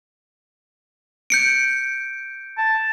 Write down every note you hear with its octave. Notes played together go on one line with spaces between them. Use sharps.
G6 C#7 D7
A5